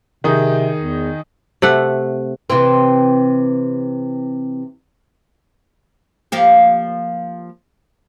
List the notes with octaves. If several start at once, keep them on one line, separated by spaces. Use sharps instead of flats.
C3 D#3 D#4 G#4
E2
C3 A3 F#5
C3 E3 C4
F3 A#3 G4